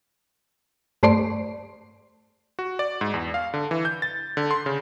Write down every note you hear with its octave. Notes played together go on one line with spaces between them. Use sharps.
G2 A3 C5 D5 C6
F#4
D5
G#2
E2
F5
D3
E3
G6
A6
D3
C6
C#3